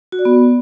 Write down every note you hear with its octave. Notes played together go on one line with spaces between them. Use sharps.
F#4
D5
B3